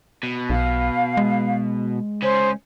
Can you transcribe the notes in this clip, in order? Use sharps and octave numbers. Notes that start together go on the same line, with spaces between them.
B2
B1 F5
G#3
C#3 C#4 C5